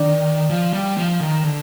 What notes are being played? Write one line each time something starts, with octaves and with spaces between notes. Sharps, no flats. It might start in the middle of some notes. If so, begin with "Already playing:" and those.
Already playing: D#3 D4 D5
F3
G3
F3
D#3
D3